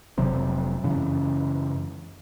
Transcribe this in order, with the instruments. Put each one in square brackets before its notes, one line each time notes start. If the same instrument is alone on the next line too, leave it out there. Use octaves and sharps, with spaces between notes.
[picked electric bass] F1 C3 F#3 C4
F#2 C#3 E3